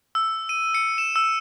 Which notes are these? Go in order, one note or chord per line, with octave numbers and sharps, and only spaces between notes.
E6
D#7
C#7
E7
E6